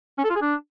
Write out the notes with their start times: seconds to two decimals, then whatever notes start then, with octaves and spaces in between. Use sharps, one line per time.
0.18 C#4
0.24 A4
0.30 F4
0.36 G#4
0.42 D4